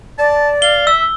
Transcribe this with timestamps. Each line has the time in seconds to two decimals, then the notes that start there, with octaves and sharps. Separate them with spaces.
0.19 D5 A5
0.62 F5 G7
0.87 E5 E6